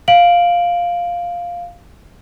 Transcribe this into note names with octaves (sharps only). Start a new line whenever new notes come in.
F5 D7 F#7